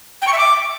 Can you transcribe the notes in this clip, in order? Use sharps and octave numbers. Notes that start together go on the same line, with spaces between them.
G5
C#6
E5
D6